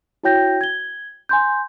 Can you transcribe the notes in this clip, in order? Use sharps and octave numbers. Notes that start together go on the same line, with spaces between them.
E4 F#4 C#5 G5 G6 A#6
G#6 G7
G#5 C6 G6